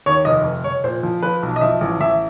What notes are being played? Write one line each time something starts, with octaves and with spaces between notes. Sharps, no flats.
D#2 C#5
F1 D#5
F1
F1 C#5
A#2 C5
F3
F3 B4
B1
D#5
F3 E5
A1
A1 E5